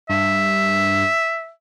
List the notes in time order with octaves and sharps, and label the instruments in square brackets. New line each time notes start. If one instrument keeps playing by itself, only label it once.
[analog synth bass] G2 [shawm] E5